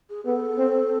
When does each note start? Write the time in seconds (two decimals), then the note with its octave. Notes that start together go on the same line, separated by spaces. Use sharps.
0.10 G#4
0.25 B3 A4
0.58 C4